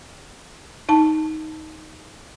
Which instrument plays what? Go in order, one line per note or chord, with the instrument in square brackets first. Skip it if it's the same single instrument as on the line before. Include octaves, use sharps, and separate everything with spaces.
[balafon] D#4 A5